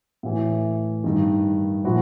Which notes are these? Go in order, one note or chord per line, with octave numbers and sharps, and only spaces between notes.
A2 E3
G2 D#3
A#2 F3 E4 F#4